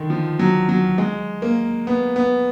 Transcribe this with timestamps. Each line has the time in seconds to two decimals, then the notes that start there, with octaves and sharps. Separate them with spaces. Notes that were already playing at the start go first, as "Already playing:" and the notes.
Already playing: D3 D#3
0.10 F3
0.39 F#3
0.69 F#3
0.98 G#3
1.42 A#3
1.87 B3
2.16 B3